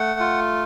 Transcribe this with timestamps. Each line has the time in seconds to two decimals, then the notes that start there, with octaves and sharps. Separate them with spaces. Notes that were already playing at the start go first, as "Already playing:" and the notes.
Already playing: A3 F#5
0.20 F4